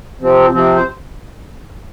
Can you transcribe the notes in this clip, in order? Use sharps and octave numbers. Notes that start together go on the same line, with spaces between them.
C3 F3 C4
C3 F3 C4
C5